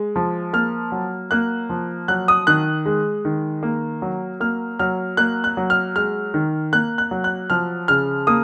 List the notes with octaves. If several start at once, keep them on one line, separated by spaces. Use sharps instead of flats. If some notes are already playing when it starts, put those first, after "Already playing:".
Already playing: G#3
F3
A#3 F6
F#3
A#3 F#6
F3
F#3 F#6
D#6
D#3 F#6
G#3
D#3
A#3
F#3
A#3 F6
F#3 F6
A#3 F#6
F#6
F#3
F6
G#3 F6
D#3
A#3 F#6
F#6
F#3
F#6
F3 F6
C#3 F6
A#3 D#6